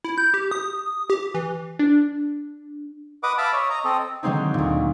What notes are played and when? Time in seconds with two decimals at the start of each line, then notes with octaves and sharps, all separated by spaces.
0.04 E4
0.18 G6
0.34 G4
0.51 D#6
1.10 G4
1.35 E3
1.79 D4
3.23 B4 D#5 F#5 D6 D#6
3.38 E5 F5 A5 B5 D6
3.53 C#5 D#5
3.70 D#5 A#5
3.85 C4 A4 D#5
4.23 D3 D#3 F#3 G#3 C4 D#4
4.54 D2 A#2